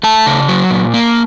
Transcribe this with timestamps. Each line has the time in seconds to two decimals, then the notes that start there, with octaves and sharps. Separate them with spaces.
0.03 A3 A5
0.26 C#3
0.48 F#3
0.70 A#2
0.94 A#3